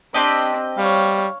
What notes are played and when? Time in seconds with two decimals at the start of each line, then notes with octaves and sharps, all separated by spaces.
0.15 C4 D4 G4 D#5
0.78 G3 C#5 F5